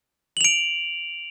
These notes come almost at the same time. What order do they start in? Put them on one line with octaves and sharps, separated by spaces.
F#7 F7 D7